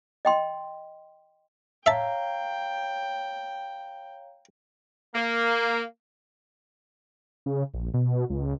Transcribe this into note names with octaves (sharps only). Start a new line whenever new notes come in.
D#5 G5 C6
C#5 E5 F5 G5 A5 A#5
A#3
C#3
A#1
B2
C#2